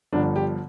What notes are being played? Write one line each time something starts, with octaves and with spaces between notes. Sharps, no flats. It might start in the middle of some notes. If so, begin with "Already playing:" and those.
G1 G2 D3 F3 D4
G4